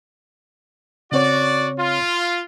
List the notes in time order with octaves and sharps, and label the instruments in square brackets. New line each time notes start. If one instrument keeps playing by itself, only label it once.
[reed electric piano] C#3 C4 C#5 [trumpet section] F#4 D5
[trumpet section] F4